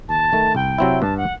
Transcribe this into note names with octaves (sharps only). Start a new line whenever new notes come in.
D#2 A5
D#3 A3
C2 G5
C3 F#3 C4 E4
G2 A5
F#5